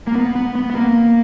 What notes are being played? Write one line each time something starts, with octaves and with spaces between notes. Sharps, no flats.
A#3
B3
B3
B3
B3
A#3